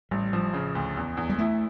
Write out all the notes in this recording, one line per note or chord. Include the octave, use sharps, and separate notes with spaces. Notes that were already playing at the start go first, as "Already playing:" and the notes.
A1 G3
F3
C#3
D2
E2
E2
G3
A3 E4